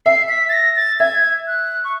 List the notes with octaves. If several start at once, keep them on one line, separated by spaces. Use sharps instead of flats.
E5 C7
B6
A6
A#6
A6
E5 G#6
F#6
C#6